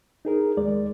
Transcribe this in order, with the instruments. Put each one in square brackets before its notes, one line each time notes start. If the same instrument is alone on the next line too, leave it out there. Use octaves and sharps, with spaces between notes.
[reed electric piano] D#4 G#4 A#4
D#2 G#3 D5